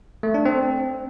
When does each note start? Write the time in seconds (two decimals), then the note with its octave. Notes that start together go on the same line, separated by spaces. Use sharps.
0.23 A3
0.34 D4
0.45 C4